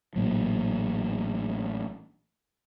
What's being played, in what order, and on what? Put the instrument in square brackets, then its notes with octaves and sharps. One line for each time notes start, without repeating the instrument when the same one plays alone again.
[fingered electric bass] A1 A#2 F#3